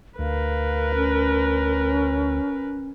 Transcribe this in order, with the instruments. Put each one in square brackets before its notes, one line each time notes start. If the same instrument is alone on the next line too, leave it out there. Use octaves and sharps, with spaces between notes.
[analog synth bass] D2 [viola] A#4 B4 [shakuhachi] F5
[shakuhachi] C#4